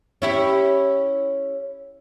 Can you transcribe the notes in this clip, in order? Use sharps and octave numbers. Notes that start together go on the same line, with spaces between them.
C#4 E4 G4